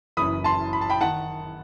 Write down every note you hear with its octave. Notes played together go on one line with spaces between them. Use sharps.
F#1 F#2 E3 B5 D#6
A5 C6
B5
A5
G5 B5
D#3 F#5 A5